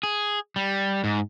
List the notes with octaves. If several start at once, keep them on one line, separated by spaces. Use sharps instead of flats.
G#4
G3
G#2